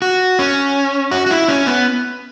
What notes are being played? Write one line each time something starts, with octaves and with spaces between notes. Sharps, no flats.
F#4
C#4
F#4
F#4
E4
C#4
B3